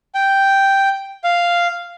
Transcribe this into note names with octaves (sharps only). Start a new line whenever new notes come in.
G5
F5